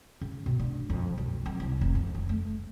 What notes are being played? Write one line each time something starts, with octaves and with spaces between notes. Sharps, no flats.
C#3
B2
D4
F2
B1
F2
C2
F1
F2
D3
A3